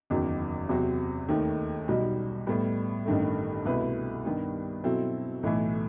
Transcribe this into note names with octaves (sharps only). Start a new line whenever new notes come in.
F#1 E2 D#3 F#3
E2 C3 F#3 C4 F#4
D#2 D#3 A3 D#4
B1 B2 G3 D#4 F#4
A2 G3 B3
A1 G2 D#3 A3
C2 B2 A3 E4 B4
G2 D#3 G3 B3
B2 F#3 C4 E4 A4
B1 A2 E3 A3